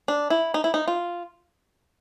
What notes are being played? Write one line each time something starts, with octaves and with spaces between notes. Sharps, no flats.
D4
E4
D#4
E4
D#4
F4